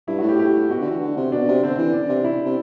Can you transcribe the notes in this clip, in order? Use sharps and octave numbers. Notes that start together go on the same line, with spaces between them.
G2 E4
F#4
A2
G4
G4
B2 F#4
D3
E3
D3
C3
B2 D4
C3
D3 C4
E3
D4
C3
E4
C3